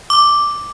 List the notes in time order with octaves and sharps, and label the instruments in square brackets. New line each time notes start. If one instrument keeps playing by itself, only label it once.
[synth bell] D6